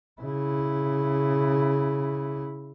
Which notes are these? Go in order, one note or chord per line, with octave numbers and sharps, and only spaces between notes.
C#3 E4